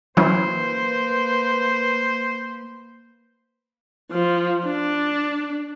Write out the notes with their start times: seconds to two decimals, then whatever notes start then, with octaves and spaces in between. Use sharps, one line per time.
0.17 E3 F#3 A#3 C#4 B4 C5
4.11 F3
4.65 D4